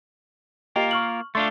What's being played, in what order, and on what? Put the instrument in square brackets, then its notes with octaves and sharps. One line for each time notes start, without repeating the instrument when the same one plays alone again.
[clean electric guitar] A#3 F4 A#4 [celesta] G4 D#5 G5
[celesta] C#6 F6 F#7
[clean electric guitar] A3 D4 F4 [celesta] C6 C#6 A6